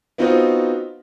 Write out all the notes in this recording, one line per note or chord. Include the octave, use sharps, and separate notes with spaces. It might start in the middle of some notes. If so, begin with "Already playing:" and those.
B3 C4 D#4 F4 F#4 C5